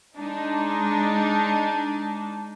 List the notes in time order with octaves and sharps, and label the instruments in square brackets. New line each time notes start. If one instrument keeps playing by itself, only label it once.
[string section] G#3 D4 D#4